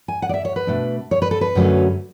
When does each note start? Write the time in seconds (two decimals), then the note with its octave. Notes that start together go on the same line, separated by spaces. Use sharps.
0.08 G#5
0.22 F#5
0.29 D5
0.34 E5
0.45 C#5
0.56 B4
0.67 B2 A3 D4
1.11 C#5
1.22 B4
1.31 A4
1.41 B4
1.55 F#2 D3 F#3 A3 C#4